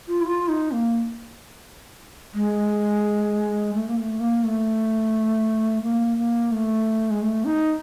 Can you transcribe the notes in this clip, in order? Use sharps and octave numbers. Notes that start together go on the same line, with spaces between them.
F4
E4
F4
D#4
A#3
G#3
A3
A#3
A3
A#3
A3
A#3
A#3
A3
G#3
A3
D#4